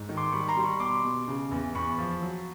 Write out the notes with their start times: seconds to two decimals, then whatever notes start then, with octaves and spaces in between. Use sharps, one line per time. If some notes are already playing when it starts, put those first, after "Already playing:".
Already playing: G#2
0.09 D#3
0.17 C6 D6
0.32 G3 B5 C#6
0.48 A#5 C6
0.57 G3
0.64 B5 C#6
0.80 B2 C6 D6
1.04 B2
1.28 C#3
1.51 E2
1.75 E2 B5 C#6
1.99 F3
2.22 F#3